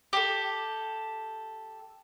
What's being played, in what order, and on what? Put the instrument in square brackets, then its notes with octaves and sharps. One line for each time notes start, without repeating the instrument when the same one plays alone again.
[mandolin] G4 A4